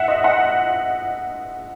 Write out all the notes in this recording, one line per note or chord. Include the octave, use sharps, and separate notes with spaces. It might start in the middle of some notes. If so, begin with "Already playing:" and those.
Already playing: E5 F#5
D#5
F#5